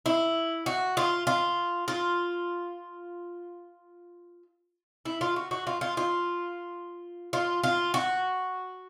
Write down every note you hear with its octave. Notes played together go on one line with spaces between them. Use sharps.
E4
F#4
F4
F4
F4
E4
F4
F#4
F#4
F4
F4
F4
F4
F4
F#4